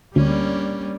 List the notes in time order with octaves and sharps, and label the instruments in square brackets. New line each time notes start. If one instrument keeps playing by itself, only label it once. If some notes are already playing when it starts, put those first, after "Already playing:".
[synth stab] D2 [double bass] G3 [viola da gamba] A#3 C#4 D4